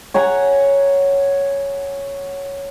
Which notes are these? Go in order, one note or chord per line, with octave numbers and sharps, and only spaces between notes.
C#5 F#5 G#5 A#5